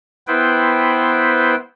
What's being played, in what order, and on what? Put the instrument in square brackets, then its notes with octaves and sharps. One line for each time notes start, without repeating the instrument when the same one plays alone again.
[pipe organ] B3 E4 B4 C5 G5